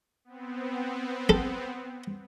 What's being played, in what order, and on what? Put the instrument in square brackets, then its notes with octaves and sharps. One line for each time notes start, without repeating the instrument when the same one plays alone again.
[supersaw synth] B3 C4
[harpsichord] A4